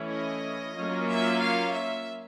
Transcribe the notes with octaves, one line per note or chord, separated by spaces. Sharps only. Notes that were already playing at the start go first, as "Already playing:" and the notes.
Already playing: E3 A3 C#4 E4
D#5
F#3 A#3 C#4 F4
E5
F5
E5